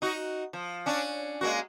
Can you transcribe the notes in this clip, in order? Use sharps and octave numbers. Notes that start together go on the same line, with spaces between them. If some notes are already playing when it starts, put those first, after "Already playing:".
D#4 F#4
F3
C#4 D4
G#3 A#3 F#4